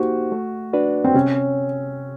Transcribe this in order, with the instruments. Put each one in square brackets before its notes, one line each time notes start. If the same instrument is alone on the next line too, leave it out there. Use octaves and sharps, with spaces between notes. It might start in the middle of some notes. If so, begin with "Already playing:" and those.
Already playing: [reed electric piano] A#3 D#4 G4 C5 [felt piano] F#4
[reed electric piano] A3
D4 F#4 B4 D5
[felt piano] C4
[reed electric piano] C3 [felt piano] C#4